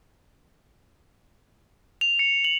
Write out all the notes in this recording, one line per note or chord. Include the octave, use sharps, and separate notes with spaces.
F7
C#7
F#7